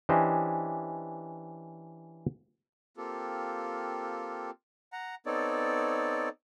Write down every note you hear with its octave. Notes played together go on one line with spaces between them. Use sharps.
E3 C#4 D4 G4 C5 D#5
A#3 C4 F4 G4 A4
F#5 A#5
B3 C4 D#4 A4 C#5 D5